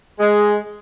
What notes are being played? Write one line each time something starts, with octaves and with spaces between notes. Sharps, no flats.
G#3 G#4